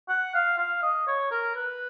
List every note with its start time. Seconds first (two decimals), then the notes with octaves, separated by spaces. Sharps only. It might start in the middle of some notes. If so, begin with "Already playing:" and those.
0.09 F#5
0.35 F5
0.58 F5
0.83 D#5
1.07 C#5
1.31 A#4
1.56 B4